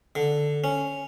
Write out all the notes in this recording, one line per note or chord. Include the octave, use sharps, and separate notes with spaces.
D3
C#4